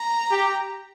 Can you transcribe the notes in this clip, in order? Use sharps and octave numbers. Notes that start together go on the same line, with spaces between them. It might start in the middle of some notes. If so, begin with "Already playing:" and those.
Already playing: A#5
G4